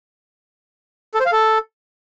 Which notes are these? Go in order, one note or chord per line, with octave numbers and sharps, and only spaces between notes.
A4
C5
F5
A4